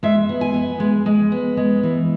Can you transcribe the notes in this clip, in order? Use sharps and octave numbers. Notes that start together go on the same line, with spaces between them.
G#3 E5
B3
G#5
B3
G#3
G#3
B3
G#3
E3